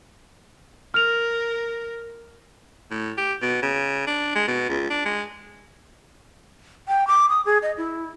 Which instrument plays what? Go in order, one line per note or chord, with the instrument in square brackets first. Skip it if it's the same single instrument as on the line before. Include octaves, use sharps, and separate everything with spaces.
[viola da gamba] A#4 [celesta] F6 F7
[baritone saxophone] A2
G4
B2
C#3
D4
G#3
B2
C#2
D4
G#3
[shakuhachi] G5
D6
D#6
G#4
D#5
E4